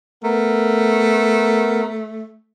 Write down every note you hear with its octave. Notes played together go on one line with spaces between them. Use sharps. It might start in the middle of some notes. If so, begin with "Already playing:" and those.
A3 B3 A#4